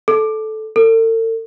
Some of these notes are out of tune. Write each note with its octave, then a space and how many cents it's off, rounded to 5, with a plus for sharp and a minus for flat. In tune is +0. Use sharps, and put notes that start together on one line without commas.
A4 -15
A4 +45